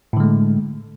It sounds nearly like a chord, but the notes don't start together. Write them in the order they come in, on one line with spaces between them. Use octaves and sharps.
A2 D3 G#3 A3